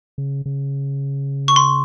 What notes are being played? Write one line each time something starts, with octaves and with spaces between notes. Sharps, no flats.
C#3
C#3
C#6
C6